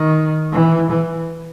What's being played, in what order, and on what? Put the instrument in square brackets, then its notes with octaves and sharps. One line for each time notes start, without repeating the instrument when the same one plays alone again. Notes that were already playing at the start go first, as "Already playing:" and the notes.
Already playing: [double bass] D#3
E3
E3